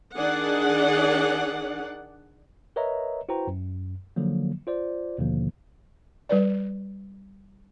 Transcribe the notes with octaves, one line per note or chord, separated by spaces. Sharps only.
D#3 D4 G#4 D5 F#5
A#4 B4 C#5 D#5 E5 A#5
E4 F#4 B4 C5 G5 A#5
F#2
D3 F3 F#3 A#3
F4 C5 D5
D#2 B2 D3 F3 A#3
G3 B4 D5